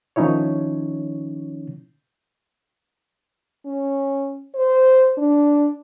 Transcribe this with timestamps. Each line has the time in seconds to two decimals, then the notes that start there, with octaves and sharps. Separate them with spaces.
0.16 D#3 F3 C#4 D#4 E4 C#5
3.66 C#4
4.55 C5
5.18 D4